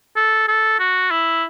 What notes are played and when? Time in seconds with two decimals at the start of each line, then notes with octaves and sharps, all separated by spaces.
0.16 A4
0.48 A4
0.79 F#4
1.11 E4